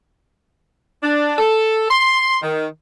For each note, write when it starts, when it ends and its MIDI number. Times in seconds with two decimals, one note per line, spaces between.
1.03 1.38 62
1.39 1.87 69
1.90 2.36 84
2.43 2.67 51